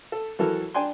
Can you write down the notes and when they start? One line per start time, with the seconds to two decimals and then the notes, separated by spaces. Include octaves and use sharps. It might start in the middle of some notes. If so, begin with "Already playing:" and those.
0.12 A4
0.39 E3 F#3 A4 A#4
0.74 D4 G5 G#5 C6